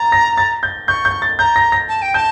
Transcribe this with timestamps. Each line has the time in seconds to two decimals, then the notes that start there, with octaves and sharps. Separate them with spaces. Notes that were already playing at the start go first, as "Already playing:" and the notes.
Already playing: A#5 A6
0.12 A#6
0.38 A6
0.63 G6
0.88 C#6 G6
1.05 G6
1.22 A6
1.39 A#5 G6
1.56 A#6
1.72 A#6
1.89 A5
2.02 G5
2.14 A5 G6